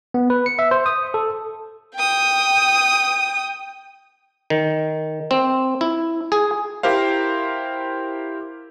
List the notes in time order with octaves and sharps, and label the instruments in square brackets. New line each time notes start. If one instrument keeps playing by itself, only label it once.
[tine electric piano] B3
B4
C#7
E5
C5
D#6
A4
[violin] G5 D#6
[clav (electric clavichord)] D#3
C4
E4
G#4
[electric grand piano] E4 G4 A#4 C5 F5